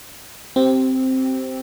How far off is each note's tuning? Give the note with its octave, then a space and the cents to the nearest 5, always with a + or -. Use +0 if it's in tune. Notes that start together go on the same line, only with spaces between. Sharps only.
C4 +0 G4 -20 C5 +0